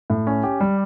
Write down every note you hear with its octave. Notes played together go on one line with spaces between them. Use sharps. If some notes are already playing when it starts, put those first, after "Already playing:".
A2
C#4
G4
G3